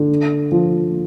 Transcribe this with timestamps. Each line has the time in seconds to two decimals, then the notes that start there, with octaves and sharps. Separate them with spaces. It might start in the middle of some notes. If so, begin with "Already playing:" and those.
Already playing: D3
0.52 F3